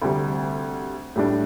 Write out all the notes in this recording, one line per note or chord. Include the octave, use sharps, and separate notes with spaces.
D2 C3 G3
A2 G3 D4